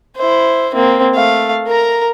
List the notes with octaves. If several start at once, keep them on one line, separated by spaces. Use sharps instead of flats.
E4 C5
A#3 C4
A3 F5
A#4 A#5